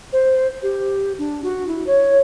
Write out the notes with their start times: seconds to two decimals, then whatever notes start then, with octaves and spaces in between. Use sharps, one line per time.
0.13 C5
0.63 G4
1.18 D4
1.44 F#4
1.67 E4
1.87 C#5